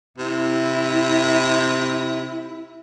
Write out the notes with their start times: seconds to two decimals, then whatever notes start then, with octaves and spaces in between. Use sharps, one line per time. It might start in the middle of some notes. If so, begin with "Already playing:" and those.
0.18 C3 E4